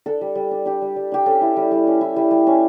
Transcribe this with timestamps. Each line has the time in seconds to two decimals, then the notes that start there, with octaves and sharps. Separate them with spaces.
0.06 D4 A4
0.21 G3
0.35 G3
0.51 D4
0.65 D4 G4
0.82 G3
0.96 G3
1.12 D4 G4
1.26 C#4 A4
1.41 E4
1.57 G3
1.71 G3
1.87 C#4
2.01 E4
2.16 G3
2.31 G3
2.47 C#4